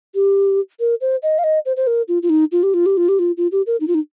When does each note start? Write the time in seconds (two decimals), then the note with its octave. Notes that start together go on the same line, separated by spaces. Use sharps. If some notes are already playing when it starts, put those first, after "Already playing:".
0.15 G4
0.80 A#4
1.01 C5
1.23 D#5
1.38 F5
1.44 D#5
1.65 C5
1.76 C5
1.87 A#4
2.08 F4
2.23 F4
2.29 D#4
2.52 F4
2.63 G4
2.74 F4
2.86 G4
2.97 F4
3.08 G4
3.19 F4
3.37 F4
3.52 G4
3.66 A#4
3.80 D#4
3.88 F4
3.94 D#4